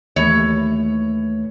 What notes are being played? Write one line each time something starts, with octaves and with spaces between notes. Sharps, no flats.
D#2 E3 A3 C#5